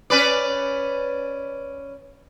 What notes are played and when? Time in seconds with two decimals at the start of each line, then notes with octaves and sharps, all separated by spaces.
0.10 C#4 B4 D5